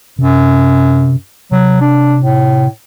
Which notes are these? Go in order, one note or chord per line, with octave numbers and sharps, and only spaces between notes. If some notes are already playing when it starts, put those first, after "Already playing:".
F#2 C3
C3 F#3
D4
A2